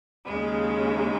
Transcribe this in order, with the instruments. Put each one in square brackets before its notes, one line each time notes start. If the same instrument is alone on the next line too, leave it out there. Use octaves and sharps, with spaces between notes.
[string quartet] D#2 C#3 G#3